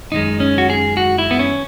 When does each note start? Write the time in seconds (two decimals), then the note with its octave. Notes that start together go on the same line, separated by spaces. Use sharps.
0.12 F#2 D#3 G#3 D#4
0.40 C#4
0.58 F#4
0.70 G#4
0.97 F#4
1.18 E4
1.31 B3
1.39 C#4